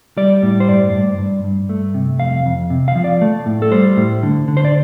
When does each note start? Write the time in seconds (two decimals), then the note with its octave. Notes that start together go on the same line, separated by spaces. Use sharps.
0.17 G3 D5
0.43 A2
0.60 C5
0.68 G2 D5
0.93 G2
1.18 G2
1.44 G2
1.69 A3
1.94 C3
2.20 F2 F5
2.46 F2
2.70 C3
2.88 F5
2.95 F3
3.04 D5
3.21 A3
3.46 A2
3.62 A4
3.72 G3 C5
3.97 A2
4.23 D3
4.48 D3
4.57 C5
4.65 D5